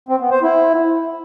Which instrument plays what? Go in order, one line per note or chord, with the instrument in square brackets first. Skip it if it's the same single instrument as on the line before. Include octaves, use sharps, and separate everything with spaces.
[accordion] C4
B3
C5
E4